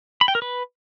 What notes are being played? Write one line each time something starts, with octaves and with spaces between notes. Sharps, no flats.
B5
G5
A#4
B4